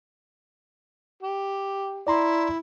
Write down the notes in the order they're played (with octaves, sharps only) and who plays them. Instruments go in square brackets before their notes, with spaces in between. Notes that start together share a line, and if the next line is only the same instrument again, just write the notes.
[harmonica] G4
[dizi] E4 [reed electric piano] D5 A#5 C6